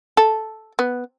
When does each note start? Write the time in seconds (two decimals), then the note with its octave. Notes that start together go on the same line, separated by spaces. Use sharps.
0.17 A4
0.79 B3